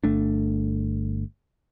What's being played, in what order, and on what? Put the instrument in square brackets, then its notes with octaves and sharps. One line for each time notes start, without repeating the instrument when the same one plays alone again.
[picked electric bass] G1 A3 D4